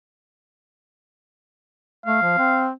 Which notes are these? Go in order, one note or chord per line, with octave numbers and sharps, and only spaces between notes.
A3 F5
F3
C4